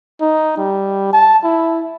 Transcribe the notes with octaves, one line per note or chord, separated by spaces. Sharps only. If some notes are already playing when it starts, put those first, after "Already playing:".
D#4
G3
A5
E4